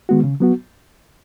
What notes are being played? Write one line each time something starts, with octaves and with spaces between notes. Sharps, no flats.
D#3 G#3 B3 F#4
C#3
F#3 B3 F#4